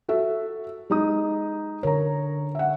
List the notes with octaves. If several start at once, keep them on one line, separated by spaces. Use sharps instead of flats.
F#4 A4 E5
G#3 D#4 D#6
D3 A#4 C#5 A#5
E5 F#5